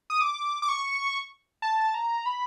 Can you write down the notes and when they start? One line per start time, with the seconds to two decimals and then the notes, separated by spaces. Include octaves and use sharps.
0.10 D#6
0.21 D6
0.62 D6
0.69 C#6
1.62 A5
1.94 A#5
2.26 B5